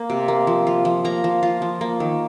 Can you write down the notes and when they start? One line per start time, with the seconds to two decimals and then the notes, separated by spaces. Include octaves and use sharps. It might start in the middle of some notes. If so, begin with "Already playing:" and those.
Already playing: A#3
0.10 C3
0.28 A#3
0.47 F3
0.67 F4
0.85 F3
1.05 A#3 A#5
1.24 F3
1.43 F4
1.62 F3
1.81 A#3
2.00 D#3